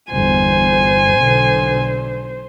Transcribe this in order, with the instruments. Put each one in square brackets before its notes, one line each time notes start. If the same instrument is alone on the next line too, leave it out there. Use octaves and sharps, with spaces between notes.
[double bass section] G1 E2 [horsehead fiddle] C5 [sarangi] G#5
[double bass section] B1 B2 D3